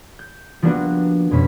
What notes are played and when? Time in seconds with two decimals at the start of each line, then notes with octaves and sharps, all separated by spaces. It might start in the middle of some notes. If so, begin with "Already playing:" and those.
0.19 G6
0.62 F3 G3 A#3 B3 D4 F#4
1.31 F2 B2 G3 C#4 B5